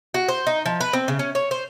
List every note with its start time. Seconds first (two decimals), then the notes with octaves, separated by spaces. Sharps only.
0.14 F#4
0.28 C5
0.47 D#4
0.66 F3
0.80 B4
0.93 C4
1.08 C#3
1.19 C#4
1.35 C#5
1.51 C5